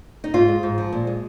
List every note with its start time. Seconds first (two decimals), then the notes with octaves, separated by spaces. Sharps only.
0.24 D#4
0.34 G#2 F4
0.48 G#3
0.63 G#2
0.78 F3
0.93 A#2
1.07 G#3